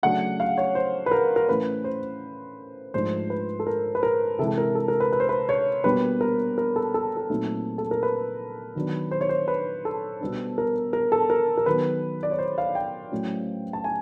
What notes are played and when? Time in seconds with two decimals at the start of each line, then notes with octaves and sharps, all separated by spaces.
0.03 C#3 F#3 A3 D4 F#5
0.40 F5
0.58 C#5
0.75 C5
1.06 B4
1.11 A#4
1.36 A#4
1.49 A2 E3 A3 C#4 B4
1.84 C5
2.94 G#2 F3 A3 D4 C5
3.30 B4
3.60 A4
3.67 A#4
3.95 B4
4.03 A#4
4.39 C3 E3 G#3 A4
4.58 A#4
4.75 A4
4.88 A#4
5.00 B4
5.13 B4
5.20 C5
5.29 B4
5.49 C#5
5.84 B2 G3 A#3 D4 B4
6.21 A#4
6.58 A#4
6.76 A4
6.94 A4
7.17 A4
7.30 A#2 F#3 A3 C4 D#4
7.78 A4
7.91 A#4
8.03 B4
8.75 D#3 F#3 B3 D4
9.11 C5
9.21 C#5
9.29 C5
9.48 B4
9.85 A4
10.21 B2 G3 B3 D4
10.58 A#4
10.93 A#4
11.12 A4
11.30 A#4
11.58 A#4
11.66 D#3 F#3 B3 B4
12.23 D5
12.31 C#5
12.38 C5
12.58 F5
12.75 G5
13.12 A2 F#3 A3 C#4
13.73 A5
13.84 G#5